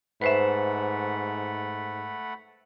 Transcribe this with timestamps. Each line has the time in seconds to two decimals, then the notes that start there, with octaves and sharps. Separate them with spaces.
0.22 G#2 A3 B4 C5 E5 F#5 B5